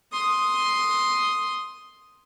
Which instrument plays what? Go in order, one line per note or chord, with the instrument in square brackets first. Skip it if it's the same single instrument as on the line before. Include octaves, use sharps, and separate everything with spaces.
[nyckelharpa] C6 D#6